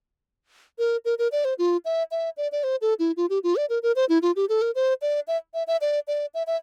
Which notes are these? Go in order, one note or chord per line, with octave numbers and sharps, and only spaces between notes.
A#4
A#4
A#4
D5
C5
F4
E5
E5
D5
D5
C5
A4
E4
F4
G4
F4
D5
A#4
A#4
C5
E4
F4
G4
A4
A#4
C5
D5
E5
E5
E5
D5
D5
E5
E5